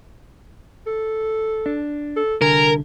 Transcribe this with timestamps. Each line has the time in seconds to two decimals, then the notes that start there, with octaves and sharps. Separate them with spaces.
0.87 A4
1.66 D4
2.16 A4
2.42 C2 D3 A#4 G#5